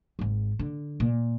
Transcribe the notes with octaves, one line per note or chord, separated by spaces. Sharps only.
G#1 G#2
D3
A#2